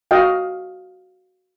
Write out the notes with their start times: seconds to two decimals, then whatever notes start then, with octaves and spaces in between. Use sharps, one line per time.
0.11 F#4 D#5 F5 G5